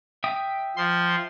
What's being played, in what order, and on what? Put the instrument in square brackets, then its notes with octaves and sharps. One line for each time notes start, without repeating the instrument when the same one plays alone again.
[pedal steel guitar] E5 G5 D#6
[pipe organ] F3 C6